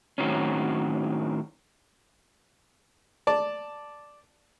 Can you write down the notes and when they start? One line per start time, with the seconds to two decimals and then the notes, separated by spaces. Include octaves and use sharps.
0.18 A2 D#3 F#3 C4 C#4
3.27 D5 A5